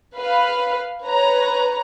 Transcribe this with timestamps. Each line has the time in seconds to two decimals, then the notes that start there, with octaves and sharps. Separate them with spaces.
0.16 B4 F5 B5
1.05 B4 C#5 A#5